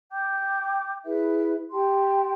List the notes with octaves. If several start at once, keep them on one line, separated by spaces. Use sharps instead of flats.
G5 D6 G6
E4 G#4 B4 E5
G4 G5 A5 C6